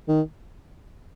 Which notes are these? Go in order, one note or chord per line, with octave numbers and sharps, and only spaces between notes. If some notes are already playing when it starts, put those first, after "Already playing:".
D#3